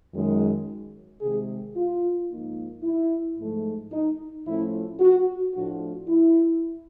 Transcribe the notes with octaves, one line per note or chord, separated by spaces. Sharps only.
F#2 D#3 G#3
C3 D#3 G#3 G#4
F4
G#2 F3 A#3 D#4
E4
G#2 F3 A3
D#4
A2 F3 A3 C#4 E4
F#4
A2 F3 A3 D4 F#4
E4